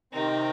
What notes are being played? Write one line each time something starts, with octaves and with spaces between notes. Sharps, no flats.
C3 D#3 C4 D#4